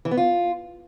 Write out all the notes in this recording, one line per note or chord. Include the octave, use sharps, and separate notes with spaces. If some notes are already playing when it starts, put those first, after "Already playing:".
E3
B3
F4